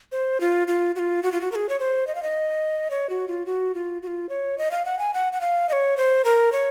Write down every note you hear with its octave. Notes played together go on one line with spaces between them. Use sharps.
C5
F4
F4
F#4
F4
F#4
F4
F#4
A#4
G#4
C#5
C5
D#5
F5
D#5
C#5
F#4
F4
F#4
F4
F#4
F4
C#5
D#5
F5
F#5
G#5
F#5
F#5
F5
D#5
C#5
C5
A#4
C#5